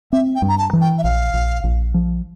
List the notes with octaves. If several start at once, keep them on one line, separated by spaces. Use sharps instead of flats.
C4 E5
G5
G2
A#5
A5
E3
G5
E5
A#1 F5
A#1
A#1
F3